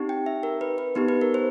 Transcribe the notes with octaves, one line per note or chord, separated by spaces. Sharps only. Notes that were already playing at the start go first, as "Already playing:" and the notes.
Already playing: C4 D#4 G4
G5
E5
A#4
B4
B4
B3 D#4 G4 B4
B4
A#4
C5